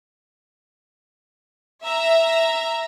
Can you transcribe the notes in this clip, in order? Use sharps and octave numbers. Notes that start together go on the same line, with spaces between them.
E5 A#5